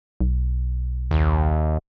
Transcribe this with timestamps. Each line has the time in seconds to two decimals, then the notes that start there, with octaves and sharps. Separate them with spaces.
0.21 B1
1.11 D#2